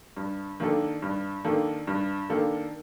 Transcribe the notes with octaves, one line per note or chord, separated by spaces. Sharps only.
G2
D#3 A#3 D4 A4
G2
D#3 A#3 D4 A4
G2
D#3 A#3 D4 A4